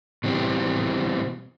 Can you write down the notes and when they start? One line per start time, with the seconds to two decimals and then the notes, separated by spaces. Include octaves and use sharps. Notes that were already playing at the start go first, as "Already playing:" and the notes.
0.24 B2 E3 G3 C4